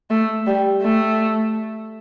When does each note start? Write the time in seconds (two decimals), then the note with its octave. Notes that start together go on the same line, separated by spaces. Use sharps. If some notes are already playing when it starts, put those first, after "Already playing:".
0.10 A3
0.47 G3
0.82 A3